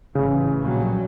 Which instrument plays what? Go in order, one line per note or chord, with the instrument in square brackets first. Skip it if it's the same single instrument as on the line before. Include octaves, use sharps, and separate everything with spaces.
[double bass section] A1 E3 [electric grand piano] C#3
[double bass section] A#1 F#3 G3